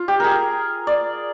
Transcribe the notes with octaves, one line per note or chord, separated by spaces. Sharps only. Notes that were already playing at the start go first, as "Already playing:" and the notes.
Already playing: F4
G4
G#4 A#4
D5